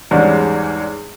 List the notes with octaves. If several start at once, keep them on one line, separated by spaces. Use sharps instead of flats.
E2 G#2 G3 G#3 C#4 D4